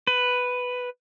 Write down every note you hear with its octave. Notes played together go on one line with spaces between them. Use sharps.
B4